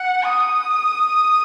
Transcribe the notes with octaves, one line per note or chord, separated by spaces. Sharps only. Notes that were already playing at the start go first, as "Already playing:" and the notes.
Already playing: F#5
D#6